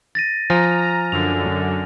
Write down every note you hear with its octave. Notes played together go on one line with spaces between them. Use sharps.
A6 A#6 D#7
F3 G#5 A#5 F6 A#6
F#2 D3 F7